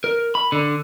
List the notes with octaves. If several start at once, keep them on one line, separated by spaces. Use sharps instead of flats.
A#4
B5
D3